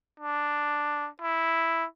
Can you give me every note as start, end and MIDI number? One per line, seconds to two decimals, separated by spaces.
0.20 1.08 62
1.22 1.85 64